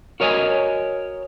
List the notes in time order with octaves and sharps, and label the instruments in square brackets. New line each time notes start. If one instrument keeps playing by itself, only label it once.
[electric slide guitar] F#4 A#4 C#5 D#5 G#5